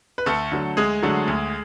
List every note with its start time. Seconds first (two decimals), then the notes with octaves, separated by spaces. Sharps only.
0.18 B4
0.26 D2 A3 A4
0.52 D3 F#3 A3
0.77 D2 G#3 G#4
1.02 D3 F#3 A3
1.28 D2